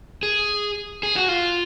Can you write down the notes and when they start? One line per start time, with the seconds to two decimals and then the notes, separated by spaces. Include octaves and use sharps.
0.23 G#4
1.03 G#4
1.16 F#4
1.28 F4